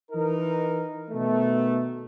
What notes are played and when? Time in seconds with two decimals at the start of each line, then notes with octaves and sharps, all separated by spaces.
0.12 E3 D#4 A#4
1.10 B2 D#3 A3